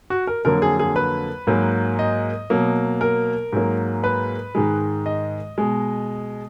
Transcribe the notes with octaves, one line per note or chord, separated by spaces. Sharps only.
F#4
A#4
F2 D3 F#3 A#3 A#4
G#4
G#4
B4
G#2 F#3 A#3
D#5
B2 F#3 A#3
A#4
G#2 F#3 A#3
B4
G#2 D#3 G#3
D#5
B2 G#3